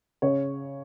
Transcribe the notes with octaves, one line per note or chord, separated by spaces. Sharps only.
C#3 C#5